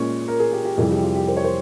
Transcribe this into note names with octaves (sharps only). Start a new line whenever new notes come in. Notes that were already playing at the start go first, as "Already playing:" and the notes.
Already playing: A#2 G#3 C#4 C#5
A#4
G#4
G4
G4
F2 C3 E3 G3 G#4
G4
F4
G4
C5
C#5
C5